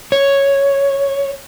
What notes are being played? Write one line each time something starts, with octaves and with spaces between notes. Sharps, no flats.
C#5